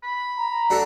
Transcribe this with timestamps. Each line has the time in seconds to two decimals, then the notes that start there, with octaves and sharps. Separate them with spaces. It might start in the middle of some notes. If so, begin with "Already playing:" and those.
0.03 B5
0.37 A#5
0.70 D4 F#4 A4